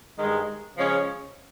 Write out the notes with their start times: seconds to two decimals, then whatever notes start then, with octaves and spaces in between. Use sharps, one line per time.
0.19 G2 D#3 G#3
0.77 C#3 F3 G#3 C#4